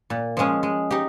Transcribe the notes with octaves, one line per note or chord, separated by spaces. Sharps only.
A#2
F3 G#3 C#4
G#3
D#4 G4